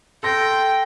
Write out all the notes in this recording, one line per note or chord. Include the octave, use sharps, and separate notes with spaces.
A4 G5 C6 A#6